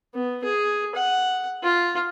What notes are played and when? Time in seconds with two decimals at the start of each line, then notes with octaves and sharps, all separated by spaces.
0.14 B3
0.44 G#4
0.95 F#5
1.63 F4